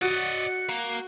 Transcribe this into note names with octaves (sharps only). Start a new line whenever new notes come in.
F#4 D5 D#5 C#7
A#3